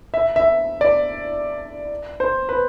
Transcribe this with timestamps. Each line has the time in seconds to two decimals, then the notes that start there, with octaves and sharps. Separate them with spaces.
0.14 E5
0.36 E5
0.81 D5
2.20 C5
2.49 B4